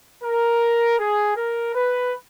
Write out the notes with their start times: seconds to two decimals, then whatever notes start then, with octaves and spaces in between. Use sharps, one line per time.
0.24 A#4
1.00 G#4
1.37 A#4
1.75 B4